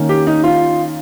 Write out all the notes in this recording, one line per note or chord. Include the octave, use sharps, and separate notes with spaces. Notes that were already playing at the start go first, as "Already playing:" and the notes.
Already playing: D#3 A#3 C#4
G4
D#4
F4